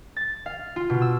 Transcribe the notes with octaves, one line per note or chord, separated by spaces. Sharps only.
A6
F5
F4
B2
E6